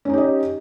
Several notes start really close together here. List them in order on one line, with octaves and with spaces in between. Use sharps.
C#4 D#4 G4 D#5